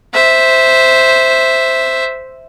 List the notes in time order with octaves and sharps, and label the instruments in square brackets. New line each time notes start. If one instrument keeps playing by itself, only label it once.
[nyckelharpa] C5 E5